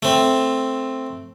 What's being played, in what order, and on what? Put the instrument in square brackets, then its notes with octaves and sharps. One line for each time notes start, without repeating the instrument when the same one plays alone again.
[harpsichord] A3 C4